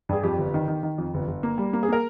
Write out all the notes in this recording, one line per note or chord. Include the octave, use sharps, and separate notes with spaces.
G2 G#4
F2 G4
G1
D#3
D#3
D#3
F2
G1
G1
A#3
G3
A#3
G#4
A#3 A#4